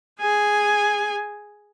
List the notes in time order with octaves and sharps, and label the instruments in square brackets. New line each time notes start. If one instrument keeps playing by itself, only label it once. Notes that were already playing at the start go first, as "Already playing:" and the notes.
[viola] G#4 G#5